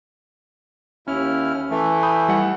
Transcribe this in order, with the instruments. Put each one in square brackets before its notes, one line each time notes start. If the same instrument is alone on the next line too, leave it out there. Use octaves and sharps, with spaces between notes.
[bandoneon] D#2 E4 F6 [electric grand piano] C#4
[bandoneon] E3 A3
[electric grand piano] B5 D#6 G6
G3 E4 F#5